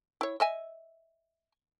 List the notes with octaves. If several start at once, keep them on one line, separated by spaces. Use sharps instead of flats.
E4 C#5
D#5 E5 G#5